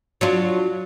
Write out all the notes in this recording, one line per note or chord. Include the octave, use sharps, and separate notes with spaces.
F#3 D4 F4